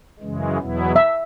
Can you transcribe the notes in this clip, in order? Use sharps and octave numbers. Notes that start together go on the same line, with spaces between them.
F#2 C#3 E3 G#3
E2 B2 F#3 B3 E4
E5